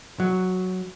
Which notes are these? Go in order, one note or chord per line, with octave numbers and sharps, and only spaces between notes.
F#3